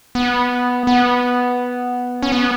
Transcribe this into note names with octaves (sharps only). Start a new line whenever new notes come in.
B3
B3
C#4
B3